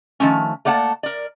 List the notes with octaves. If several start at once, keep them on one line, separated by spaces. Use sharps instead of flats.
D#3 F3 A3 C#4
A3 A#3 D5 F#5 A5
A#4 D5